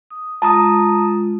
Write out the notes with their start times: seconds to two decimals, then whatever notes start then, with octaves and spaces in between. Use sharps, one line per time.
0.10 D#6
0.42 G#3 F4 A5 A#5 D#6